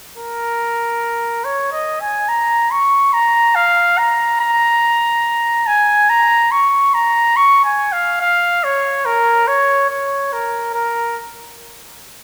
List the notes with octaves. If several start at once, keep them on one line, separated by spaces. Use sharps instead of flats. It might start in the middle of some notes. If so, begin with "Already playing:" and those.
A#4
C#5
D#5
G#5
A#5
C#6
A#5
F5
A#5
A#5
G#5
A#5
C#6
A#5
C#6
G#5
F5
F5
C#5
A#4
C#5
C#5
A#4
A#4